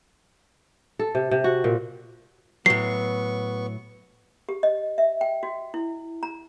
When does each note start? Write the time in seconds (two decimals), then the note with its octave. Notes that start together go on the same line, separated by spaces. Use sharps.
0.99 A4
1.15 C3
1.31 C3
1.44 F#4
1.64 A#2
2.66 A2 F#3 B3 C#6 C7
4.49 G4
4.63 D#5
4.98 E5
5.21 G5
5.43 F#4
5.74 E4
6.23 A#5